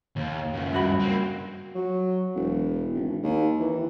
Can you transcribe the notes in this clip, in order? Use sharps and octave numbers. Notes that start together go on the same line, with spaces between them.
D#2
C#2 F#2
G2 F#4 B5
A#3 C4
F#3
E1
G#1
D#2
E3